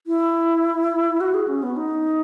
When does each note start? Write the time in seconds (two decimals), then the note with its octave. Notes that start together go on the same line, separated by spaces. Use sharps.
0.07 E4
1.21 F#4
1.34 G#4
1.48 C#4
1.63 B3
1.77 D#4